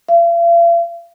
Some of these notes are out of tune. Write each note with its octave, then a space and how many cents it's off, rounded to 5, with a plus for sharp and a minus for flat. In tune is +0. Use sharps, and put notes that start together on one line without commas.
F5 -45